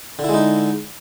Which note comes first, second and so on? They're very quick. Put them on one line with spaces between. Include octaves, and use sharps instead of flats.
D3 E4 G#3 D#4